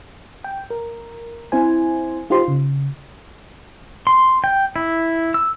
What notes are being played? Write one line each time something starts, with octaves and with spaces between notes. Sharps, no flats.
G5
A#4
C4 E4 C5 G#5
D#4 F4 G4 C5 C6
C#3
C6
G5
E4
E6